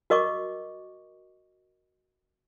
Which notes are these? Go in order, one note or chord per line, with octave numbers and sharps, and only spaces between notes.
F#4 A#4 D#5 C#6 D6